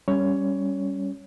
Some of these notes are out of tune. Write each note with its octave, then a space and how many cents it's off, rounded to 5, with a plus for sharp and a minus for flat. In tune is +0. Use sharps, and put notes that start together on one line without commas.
G3 +0 C#4 +0 C#5 +10